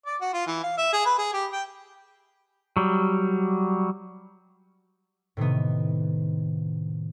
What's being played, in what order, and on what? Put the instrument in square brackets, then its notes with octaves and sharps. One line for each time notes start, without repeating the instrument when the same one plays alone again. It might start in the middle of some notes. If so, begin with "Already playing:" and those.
[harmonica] D5
F#4
F4
E3
F5
E5
G#4
B4
G#4
G4
G5
[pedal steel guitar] F#3 G3
[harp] A2 C3 D#3 B3